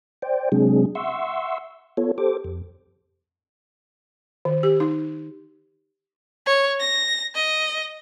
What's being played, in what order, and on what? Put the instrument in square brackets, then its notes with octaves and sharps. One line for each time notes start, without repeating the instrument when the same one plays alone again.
[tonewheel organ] C5 D5 G5
C3 F#3 G#3 C4 D4 G#4
E5 F#5 C6 C#6 E6
B3 F4 A4 C#5
G4 A4 C5 D6
F2
[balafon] D#3
G4
D#4
[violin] C#5
A#6
D#5